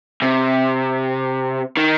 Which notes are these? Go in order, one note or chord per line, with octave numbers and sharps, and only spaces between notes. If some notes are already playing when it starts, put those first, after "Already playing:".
C3
D#3